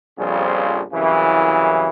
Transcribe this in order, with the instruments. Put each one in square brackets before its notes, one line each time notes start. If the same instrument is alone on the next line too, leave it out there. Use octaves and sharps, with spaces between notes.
[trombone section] A#1 F2 C#3 F3 G3
C2 F#2 C#3 E3